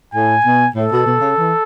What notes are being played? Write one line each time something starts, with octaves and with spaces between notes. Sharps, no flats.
A2 G#5
B2
A2 A4
B2
B2
C#3
E3